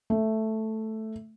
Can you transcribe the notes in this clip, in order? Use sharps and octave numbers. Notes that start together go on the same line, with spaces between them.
A3